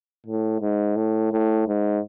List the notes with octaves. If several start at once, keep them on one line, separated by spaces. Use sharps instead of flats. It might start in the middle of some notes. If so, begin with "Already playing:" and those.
A2
G#2
A2
A2
G#2